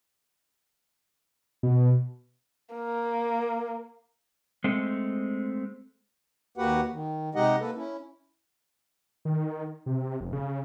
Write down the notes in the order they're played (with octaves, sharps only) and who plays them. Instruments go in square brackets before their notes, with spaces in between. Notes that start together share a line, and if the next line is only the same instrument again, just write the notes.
[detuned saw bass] B2
[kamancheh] A#3
[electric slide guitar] G#3 A3 C4
[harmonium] D#2 A#3 F#4 G4 B4 F#5
D#3
C3 G#3 D#4 G4 D#5 F#5
A#3 A4 B4
C#4 E4
[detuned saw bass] D#3
C3
F1
C#3